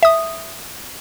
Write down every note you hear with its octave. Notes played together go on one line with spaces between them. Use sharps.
E5 D#6